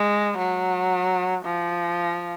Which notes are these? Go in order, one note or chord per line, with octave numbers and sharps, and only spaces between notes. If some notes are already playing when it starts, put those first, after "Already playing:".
Already playing: G#3
F#3
F3